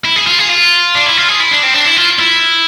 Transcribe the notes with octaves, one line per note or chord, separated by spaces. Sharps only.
E4
G#4
F4
G#4
F4
D4
E4
F4
G#4
E4
D4
C4
D4
E4
F4
E4